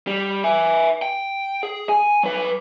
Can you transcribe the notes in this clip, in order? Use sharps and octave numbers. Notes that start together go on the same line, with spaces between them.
G3
E5 G#5
G5
G#4
G#5
F#3 B4